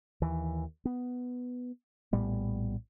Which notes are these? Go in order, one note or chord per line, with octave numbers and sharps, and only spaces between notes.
D#2 E3
B3
A#1 A2 G3 B3